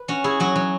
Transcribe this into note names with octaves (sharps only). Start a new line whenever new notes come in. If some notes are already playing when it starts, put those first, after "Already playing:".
Already playing: B4
C#4 F#4
E4 G#4
F#3 F#4
F#3